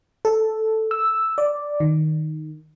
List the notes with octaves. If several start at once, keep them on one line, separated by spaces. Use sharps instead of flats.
A4
E6
D5
D#3